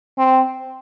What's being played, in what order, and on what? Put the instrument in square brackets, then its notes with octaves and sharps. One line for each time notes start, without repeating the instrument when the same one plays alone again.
[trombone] C4